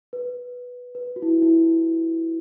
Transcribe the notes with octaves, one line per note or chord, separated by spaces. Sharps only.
B4
B4
F#4
E4
E4